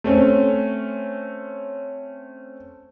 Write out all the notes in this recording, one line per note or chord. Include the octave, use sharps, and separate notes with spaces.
A3 C4 C#4